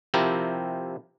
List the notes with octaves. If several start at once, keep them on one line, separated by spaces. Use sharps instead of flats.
C3 F3 C4 E4 G4 A#4